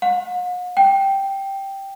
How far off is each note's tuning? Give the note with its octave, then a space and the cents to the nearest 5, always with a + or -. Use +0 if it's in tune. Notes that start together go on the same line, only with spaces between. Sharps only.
F#5 -45
G5 -5